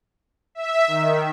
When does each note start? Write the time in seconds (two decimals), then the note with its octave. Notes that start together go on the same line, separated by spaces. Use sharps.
0.55 E5
0.88 D#3